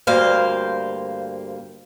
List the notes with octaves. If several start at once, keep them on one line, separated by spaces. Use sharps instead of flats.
D2 G2 A#3 C5 F5